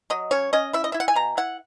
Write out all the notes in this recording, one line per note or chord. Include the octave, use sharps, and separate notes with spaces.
F#3 D#5
C#4 C#5
C#4 D#5
E4 E5
D#5
E4 E5
F#5
G#5
B2 A#5
E4 F#5